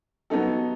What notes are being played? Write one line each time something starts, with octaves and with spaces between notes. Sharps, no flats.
F#3 B3 D#4 A4